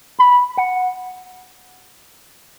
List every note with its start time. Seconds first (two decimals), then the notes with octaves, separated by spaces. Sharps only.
0.19 B5
0.57 F#5